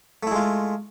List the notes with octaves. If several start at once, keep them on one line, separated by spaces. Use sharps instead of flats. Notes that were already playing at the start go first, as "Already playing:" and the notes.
G#3 A3 E4 F4